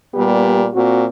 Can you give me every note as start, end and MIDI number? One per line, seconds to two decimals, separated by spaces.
0.15 0.68 46
0.15 0.68 55
0.15 0.68 59
0.15 0.68 67
0.73 1.06 46
0.73 1.06 60
0.73 1.06 66